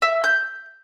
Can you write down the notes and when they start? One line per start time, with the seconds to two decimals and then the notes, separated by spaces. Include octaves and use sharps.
0.02 E5
0.24 G6